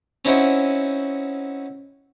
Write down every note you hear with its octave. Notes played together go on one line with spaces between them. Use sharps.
C4 C#4 D#4 E4 F#4 C5